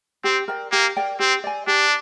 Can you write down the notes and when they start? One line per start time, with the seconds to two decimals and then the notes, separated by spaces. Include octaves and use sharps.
0.24 C4 G4
0.48 A#4 D5 G5
0.72 A#3 G4
0.97 A#4 D5 G5
1.20 C4 G4
1.44 D5 G#5
1.67 D4 G4